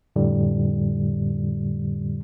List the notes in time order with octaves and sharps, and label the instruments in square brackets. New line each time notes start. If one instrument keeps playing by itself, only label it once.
[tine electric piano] F2 A2 D3 G3